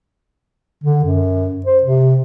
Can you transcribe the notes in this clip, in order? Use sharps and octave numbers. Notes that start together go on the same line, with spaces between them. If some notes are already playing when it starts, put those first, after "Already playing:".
D3
F#2
C5
C3